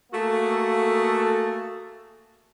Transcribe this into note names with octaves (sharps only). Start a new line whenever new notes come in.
A3 A#3 F#4 G#4 A4